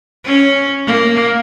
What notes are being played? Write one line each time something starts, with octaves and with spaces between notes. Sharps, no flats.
C#4
A#3